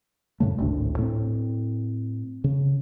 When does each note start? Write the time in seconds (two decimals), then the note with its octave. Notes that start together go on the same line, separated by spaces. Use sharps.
0.40 F#2 A2 C#3 A3
0.58 G#1 D2 A2 D4
0.98 A2 C4
2.44 C#3